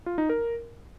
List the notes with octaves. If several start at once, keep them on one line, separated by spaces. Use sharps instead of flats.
F4
D#4
A#4